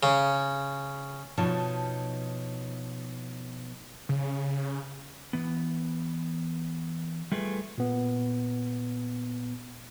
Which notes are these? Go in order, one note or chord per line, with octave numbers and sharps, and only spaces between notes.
C#3
B2 F3 D#4 C#5 A5
C#3
E3 B3
G3 A3 F4 G#4 B4
A#2 B3